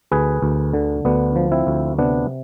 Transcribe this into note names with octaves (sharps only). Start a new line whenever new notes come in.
D2 G#4 B4
D2
D3
D2 B3 D4
F3
C4 E4
D2
C3 B3 D4